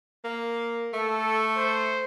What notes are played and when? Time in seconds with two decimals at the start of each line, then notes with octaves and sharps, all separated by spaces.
0.24 A#3
0.93 A3 A4
1.58 C5